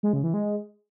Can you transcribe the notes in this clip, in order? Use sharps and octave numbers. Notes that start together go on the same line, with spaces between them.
G#3
C#3
E3
G#3